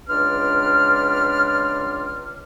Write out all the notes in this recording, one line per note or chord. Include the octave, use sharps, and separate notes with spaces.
C#2 D4 B4 D5 C6 F6